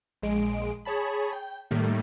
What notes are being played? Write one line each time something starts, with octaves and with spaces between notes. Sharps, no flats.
A#1 G#3 D7
G#4 C#5 A5 B5
G5
A2 D#3 G3 A3 A#3